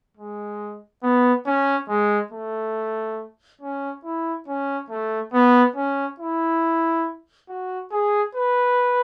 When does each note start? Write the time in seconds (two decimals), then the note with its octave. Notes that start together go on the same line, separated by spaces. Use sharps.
0.17 G#3
1.03 B3
1.46 C#4
1.89 G#3
2.32 A3
3.61 C#4
4.05 E4
4.48 C#4
4.90 A3
5.34 B3
5.76 C#4
6.20 E4
7.49 F#4
7.92 G#4
8.35 B4